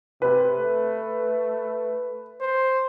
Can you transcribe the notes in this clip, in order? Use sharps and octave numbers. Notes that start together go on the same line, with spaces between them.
C3 B4
A3
C5